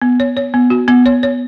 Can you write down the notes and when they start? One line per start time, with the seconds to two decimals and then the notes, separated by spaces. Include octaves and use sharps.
0.02 B3
0.20 C#5
0.37 C#5
0.54 B3
0.70 F#4
0.88 B3
1.06 C#5
1.23 C#5